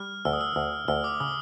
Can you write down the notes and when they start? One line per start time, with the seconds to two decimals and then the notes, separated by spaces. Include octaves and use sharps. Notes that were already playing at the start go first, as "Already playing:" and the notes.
Already playing: G3 F6
0.25 D2 E6
0.33 D#6
0.41 E6
0.56 D2
0.88 D2 E6
1.04 D6
1.20 C#3 D#6